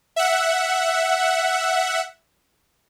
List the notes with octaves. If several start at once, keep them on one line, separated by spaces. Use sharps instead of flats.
E5 F#5